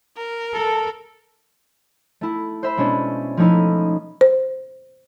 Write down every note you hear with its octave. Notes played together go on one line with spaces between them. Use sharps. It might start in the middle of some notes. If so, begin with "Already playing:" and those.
A#4
A4
A3 E4
C5 E5 B5
B2 G#3 C#4 D4
F3 A3 C#4 D#4 E4
C5